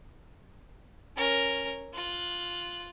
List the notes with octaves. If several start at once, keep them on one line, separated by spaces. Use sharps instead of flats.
C#4 A#4
F4 F#6